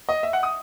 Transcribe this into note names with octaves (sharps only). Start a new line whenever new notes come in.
D#5
E5
F#5
D#6